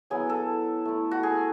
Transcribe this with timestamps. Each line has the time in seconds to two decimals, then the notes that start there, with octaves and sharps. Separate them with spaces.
0.10 F#3 B3 E4 G#4
0.29 A4
0.85 A3 E4
1.11 F#4
1.23 G#4